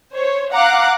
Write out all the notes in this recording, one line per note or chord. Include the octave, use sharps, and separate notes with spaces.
C5 C#5
F5 F#5 A#5 D6 F#6